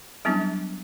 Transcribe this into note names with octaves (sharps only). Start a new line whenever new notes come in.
F#3 G3 B3 C#4 D4 E4